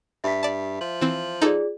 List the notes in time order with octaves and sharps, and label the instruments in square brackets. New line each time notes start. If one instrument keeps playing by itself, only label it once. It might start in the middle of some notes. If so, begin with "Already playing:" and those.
[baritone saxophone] G2 [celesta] E5 B6
[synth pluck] D5 A5
[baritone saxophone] F3
[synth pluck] E3 C4
[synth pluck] D#4 A4 [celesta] F4 G#4 D5